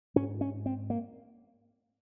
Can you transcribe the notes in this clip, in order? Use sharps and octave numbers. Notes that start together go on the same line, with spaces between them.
G#2 C#4
C#4
C4
A#3